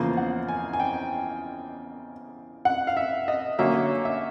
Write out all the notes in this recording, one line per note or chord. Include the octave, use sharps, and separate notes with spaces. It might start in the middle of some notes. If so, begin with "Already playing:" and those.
Already playing: E2 C#3 F3 A#3 C5
F#5
G#5
G#5
G5
F#5
F5
E5
D#5
D3 F#3 A#3 C#4 E5
E5